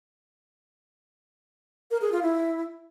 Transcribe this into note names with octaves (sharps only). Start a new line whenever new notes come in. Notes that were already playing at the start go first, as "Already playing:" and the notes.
A#4
G#4
F4
E4